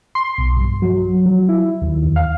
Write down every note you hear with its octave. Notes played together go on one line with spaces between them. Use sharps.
C6
B1
G2
F#3
F#3
E4
D#2
E2
F5